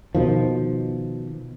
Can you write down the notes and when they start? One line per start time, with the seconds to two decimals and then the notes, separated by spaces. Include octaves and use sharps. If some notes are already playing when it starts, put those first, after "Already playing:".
0.15 B2 D#3 F3